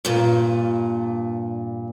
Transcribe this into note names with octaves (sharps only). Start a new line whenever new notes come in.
G2 A#2